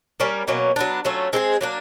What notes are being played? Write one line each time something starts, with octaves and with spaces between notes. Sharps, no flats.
G3 A#3 C#4
B2 F#3 A#3 C#4
F#3 B3 D4
F#3 A3 C#4 F4
G#3 C4 F4 G#4
F#3 A#3 D4